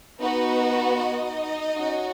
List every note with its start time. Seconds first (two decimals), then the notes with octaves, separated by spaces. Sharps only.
0.19 B3 D#4 F#4 B4
0.98 D#4 D#5
1.76 C#4 F#4